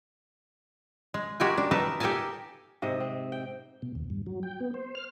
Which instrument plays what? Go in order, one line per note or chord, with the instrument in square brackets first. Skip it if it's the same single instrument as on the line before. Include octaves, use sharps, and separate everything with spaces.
[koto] G#3
G#3 F#4 G4 A#4 G5 G#5
D4
D#4 A#4 B4 E5 A5
G4 A4 A#4 D#5 G#5 A5
[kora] G#2 C3 D#5 E5
C4
G5
[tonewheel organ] B2
D#2
G2
F#3
G5
B3
C5
F6